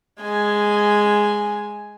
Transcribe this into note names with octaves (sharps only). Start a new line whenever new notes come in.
G#3 G#5